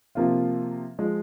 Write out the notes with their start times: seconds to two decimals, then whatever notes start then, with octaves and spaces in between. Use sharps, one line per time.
0.15 C3 F3 A#3 F4
0.99 F3 G#3